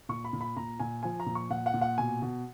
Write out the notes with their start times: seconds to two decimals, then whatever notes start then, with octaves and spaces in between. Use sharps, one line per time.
0.09 A#2 C#6
0.25 B5
0.33 A#2
0.41 B5
0.57 A#2 A#5
0.80 A#2 G#5
1.03 F3 G#5
1.20 A#5
1.26 A#2
1.35 C#6
1.50 A#2 F#5
1.66 F#5
1.74 A#2
1.81 F#5
1.98 B2 G#5
2.22 B2